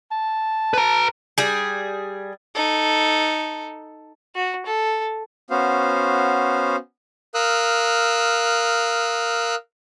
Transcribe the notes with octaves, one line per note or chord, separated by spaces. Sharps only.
A5
B4 A#5
G3 G#4
D#4 A4
F#4
A4
B3 C#4 F#4 C5 F5
A#4 F5 D#6 E6 F#6